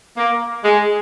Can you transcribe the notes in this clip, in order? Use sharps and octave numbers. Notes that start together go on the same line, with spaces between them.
A#3
G#3